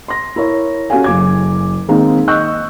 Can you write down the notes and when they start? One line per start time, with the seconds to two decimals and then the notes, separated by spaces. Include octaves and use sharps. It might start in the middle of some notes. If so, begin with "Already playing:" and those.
0.08 C6 A#6
0.36 E4 A#4 C#5
0.90 C#4 F#4 G4 A4 F5 G#5
1.04 F#1 D6 G#6
1.88 D#3 G#3 A#3 C4 D#4
2.28 D#5 C#6 E6 F#6 G6